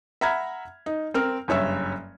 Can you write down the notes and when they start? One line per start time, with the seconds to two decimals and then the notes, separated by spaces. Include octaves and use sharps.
0.21 E5 F#5 A#5 B5 F6 G#6
0.86 D#4
1.14 C4 A#4 F6
1.48 F#1 G2 C#5 E5 E6